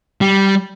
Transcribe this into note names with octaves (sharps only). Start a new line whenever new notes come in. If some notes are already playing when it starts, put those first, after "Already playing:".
G3